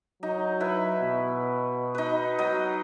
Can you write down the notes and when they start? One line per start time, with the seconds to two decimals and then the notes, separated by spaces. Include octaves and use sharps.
0.23 F#3 D#4
0.60 E4 B4
1.03 B2
1.95 D#4 B4
2.39 F#3 D#5